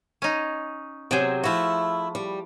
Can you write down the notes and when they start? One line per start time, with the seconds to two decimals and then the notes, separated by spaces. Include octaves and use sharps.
0.22 C#4 D#4
1.11 C3 F#3 G#4 C5 G5
1.44 F3 A3 E4 F#4
2.15 G3